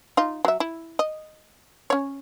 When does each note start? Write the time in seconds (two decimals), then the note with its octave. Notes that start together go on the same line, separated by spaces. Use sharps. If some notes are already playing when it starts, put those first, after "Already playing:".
0.17 D#4 F4
0.45 F#3 E5
0.60 E4
0.99 D#5
1.90 C#4 C#5